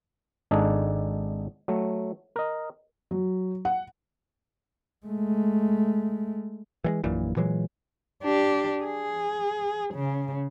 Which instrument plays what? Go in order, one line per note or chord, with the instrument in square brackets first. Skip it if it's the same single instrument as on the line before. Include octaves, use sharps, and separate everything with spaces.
[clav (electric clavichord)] G#1 D4 D#4 G#4 A4
F#3 A3
A#4 D#5
[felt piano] F#3
F#5
[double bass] G#3 A3
[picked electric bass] E3 G3 G#3
A#1 F#2 A#2 E3
A#2 E3 F#3 G#3
[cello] D4 G4
G#4
C#3